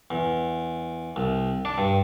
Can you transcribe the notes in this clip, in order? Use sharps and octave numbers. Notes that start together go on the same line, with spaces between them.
E2
C2
D4
G2